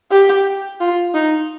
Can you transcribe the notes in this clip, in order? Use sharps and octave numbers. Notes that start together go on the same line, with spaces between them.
G4
F4
D#4